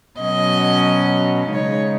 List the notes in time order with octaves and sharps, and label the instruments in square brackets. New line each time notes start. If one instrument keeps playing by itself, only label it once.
[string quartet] B2 F#3 C#4 D#5
C#3 G#3 D#4 C#5